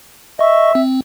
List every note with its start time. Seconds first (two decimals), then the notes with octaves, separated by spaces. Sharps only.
0.39 D#5 E5 C#6
0.75 C4